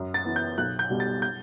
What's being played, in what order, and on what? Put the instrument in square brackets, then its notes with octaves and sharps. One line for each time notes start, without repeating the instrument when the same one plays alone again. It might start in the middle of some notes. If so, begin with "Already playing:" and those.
Already playing: [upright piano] F#2
A6
E3 B3
G6
B1 F#6
G6
B2 G3
A6
G6